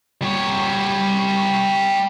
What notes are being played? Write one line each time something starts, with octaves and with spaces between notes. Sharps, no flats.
G3 C#5